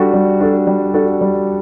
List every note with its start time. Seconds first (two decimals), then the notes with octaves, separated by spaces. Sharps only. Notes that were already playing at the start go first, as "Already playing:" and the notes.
Already playing: G3 D4 F#4 A4
0.14 G3
0.40 D4 F#4 A4
0.67 G3
0.94 D4 F#4 A4
1.21 G3